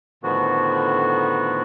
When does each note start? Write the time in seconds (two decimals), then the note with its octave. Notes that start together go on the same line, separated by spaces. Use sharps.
0.23 A2 D3 D#3 F3 B3 F#4